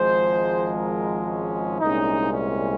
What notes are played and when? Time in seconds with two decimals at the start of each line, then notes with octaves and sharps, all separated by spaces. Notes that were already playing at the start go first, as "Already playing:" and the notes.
Already playing: G#1 G#2 F3 G#3 C5
0.74 A#4
1.27 C#4
1.80 C2 A#2 G#3 C#4 D#4
2.33 C#4